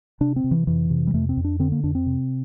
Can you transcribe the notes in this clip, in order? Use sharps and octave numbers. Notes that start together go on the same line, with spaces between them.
C3 D4
C4
C3
E3
F2 E3
C3
G3
F2 A3
C4
F2
D4
D3 C4
A#3
F2 D4
C4
C3